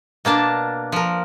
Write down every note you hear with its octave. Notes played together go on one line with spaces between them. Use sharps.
B2 A#3 D4 A5
F3 A#4